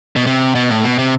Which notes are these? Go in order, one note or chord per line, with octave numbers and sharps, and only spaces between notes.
B2
C3
B2
A2
B2
C3